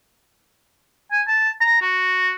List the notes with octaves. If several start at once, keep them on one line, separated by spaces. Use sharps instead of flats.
G#5
A5
A#5
F#4